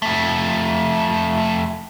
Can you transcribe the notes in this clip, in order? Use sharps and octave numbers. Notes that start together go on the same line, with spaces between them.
F2 A3